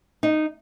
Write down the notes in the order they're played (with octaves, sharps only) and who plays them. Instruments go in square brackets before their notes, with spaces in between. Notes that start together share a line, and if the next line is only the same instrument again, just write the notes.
[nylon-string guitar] D#4